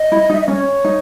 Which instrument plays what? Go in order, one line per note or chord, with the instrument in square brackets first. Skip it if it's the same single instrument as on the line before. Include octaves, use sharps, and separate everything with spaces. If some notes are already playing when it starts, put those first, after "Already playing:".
Already playing: [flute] D#5
[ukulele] E4
D#4
[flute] E5
D#5
[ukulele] C#4 [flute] C#5
[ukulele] D#4